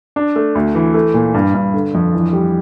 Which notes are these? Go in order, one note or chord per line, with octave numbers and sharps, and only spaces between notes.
D4
A3
D2
E3
A3
A#2
G2
G2
D3
F2
E3
G3